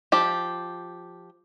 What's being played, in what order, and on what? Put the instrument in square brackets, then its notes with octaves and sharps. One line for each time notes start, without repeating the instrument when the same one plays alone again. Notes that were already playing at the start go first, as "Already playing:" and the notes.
[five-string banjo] F3 G4